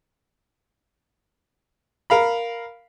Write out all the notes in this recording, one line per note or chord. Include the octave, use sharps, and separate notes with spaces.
A#4 F5 B5